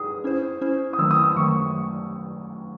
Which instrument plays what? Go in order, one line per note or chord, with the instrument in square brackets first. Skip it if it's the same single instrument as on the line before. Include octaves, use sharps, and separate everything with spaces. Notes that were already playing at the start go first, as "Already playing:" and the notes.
Already playing: [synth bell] D#4 G#4 [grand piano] D#6
[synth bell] C#4 E4 C5
C#4 E4 C5
[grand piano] D#6
[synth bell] D#3 F#3 A3 [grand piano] E6
[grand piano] D#6
D#6
[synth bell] D#3 F#3 A3 [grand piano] C#6